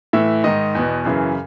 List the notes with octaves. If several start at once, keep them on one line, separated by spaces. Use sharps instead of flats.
A2 E3 E5
G#2 D#3 D#5
E2 B2
F#2 C#3 E3